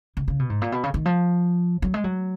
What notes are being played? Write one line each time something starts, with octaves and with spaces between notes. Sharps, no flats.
C#3
C#3
B2
G#2
A#2
B2
C#3
D#3
F3
F#3
G#3
F#3